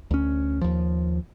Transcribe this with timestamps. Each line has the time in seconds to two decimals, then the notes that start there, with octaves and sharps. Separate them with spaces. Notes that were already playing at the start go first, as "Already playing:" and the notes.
0.11 D2 C#4
0.61 D#2 F3